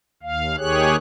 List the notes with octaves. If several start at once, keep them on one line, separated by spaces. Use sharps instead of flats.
D#2 F5
D#2 D#3 G4 G#4 C#5 F#6